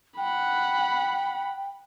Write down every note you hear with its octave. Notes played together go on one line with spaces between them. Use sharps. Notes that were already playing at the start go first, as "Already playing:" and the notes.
F#5 G5 B5